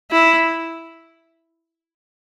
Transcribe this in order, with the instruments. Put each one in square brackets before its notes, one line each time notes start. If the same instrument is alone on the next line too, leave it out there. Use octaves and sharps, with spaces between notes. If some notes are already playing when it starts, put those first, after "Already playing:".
[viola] E4